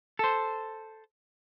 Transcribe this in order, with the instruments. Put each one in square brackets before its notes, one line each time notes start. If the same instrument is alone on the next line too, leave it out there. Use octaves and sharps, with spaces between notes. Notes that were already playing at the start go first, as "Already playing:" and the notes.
[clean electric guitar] A4 C5